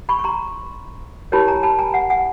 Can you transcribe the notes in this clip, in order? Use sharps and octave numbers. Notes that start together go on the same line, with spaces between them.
B5 C#6
C#6
A#5 C6
E4 G4 A#4 C#5 A5 B5
G#5 A#5
A5 B5
G#5 A#5
F#5 G#5
F#5 G#5